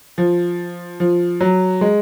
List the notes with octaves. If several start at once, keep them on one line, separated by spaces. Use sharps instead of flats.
F3
F3
F#3
G#3